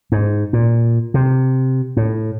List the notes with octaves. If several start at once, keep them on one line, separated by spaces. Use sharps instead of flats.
G#2
A#2
C3
A2